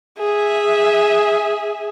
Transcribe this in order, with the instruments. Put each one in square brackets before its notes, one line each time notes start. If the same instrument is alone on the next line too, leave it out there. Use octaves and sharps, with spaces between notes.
[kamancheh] G#4 E5